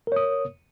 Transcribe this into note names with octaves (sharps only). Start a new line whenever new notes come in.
A#4 C#5 D#6